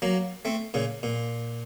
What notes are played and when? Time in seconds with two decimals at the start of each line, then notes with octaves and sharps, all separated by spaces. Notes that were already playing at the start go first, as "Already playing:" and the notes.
0.02 F#3 A#3
0.45 A3 C4
0.74 A#2 C#3
1.03 A#2